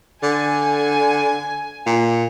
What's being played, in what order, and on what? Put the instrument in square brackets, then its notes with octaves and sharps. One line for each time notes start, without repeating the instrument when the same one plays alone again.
[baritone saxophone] D3 [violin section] G#5
[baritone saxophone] A#2